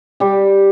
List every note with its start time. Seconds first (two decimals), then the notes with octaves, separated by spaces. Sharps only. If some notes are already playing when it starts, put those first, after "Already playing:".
0.20 G3 G4